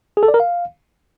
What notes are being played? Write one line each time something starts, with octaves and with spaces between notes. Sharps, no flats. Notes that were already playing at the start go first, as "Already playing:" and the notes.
G#4
A4
D5
A#4
F5